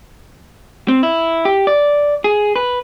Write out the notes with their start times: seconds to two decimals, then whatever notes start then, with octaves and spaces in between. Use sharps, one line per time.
0.88 C4
1.03 E4
1.45 G4
1.67 D5
2.24 G#4
2.56 B4